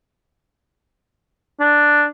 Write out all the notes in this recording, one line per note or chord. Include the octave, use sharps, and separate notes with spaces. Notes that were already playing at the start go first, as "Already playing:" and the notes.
D4